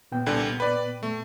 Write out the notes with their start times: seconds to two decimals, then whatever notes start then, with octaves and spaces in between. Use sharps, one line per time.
0.12 A#2 B3 G5
0.26 C2 D3
0.60 B4 D5
1.03 A3